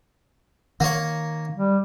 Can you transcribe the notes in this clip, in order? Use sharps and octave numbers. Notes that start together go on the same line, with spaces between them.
D#3 A#3 C#5
G3